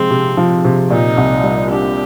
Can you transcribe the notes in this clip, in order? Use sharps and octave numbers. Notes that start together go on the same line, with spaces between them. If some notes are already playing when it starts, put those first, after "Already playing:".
Already playing: C3 F3 G#3 C4
C3
F3
C3
A#2 D#4
C2
G3
D4 G4